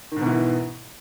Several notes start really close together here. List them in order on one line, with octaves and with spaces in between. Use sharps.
D#3 G#2 B2 E3